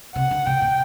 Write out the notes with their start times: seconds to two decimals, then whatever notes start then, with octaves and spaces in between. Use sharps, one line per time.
0.15 C3 F#5
0.31 D3
0.46 C3 G5
0.62 B2